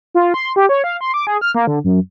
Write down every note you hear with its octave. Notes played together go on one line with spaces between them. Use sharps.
F4
C6
G4
C#5
F5
C6
D6
G#4
F6
A#3
D3
F#2